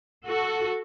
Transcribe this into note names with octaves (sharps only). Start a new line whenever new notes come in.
F#4 A4